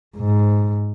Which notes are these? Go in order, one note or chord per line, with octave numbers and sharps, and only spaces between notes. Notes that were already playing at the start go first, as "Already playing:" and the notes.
G#2